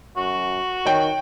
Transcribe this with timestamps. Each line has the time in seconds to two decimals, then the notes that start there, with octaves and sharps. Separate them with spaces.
0.17 F#2 F#4
0.85 D#3 C#5 G5